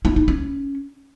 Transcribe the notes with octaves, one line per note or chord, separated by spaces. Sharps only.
E4
D#4
C#4